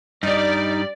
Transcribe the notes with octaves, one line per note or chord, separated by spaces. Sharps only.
G2 G3 D#4 D5